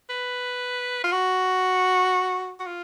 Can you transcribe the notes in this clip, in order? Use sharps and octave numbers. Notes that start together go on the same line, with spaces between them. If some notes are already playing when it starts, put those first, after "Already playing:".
B4
F4
F#4
F#4
F4